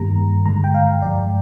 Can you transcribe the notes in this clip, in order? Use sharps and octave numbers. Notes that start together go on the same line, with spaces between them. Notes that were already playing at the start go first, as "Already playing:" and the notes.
Already playing: G2 D#3 G3 A#3 A#5
G2 D3 G#3 A#5
G5
F5
G2 F3 G#3 D5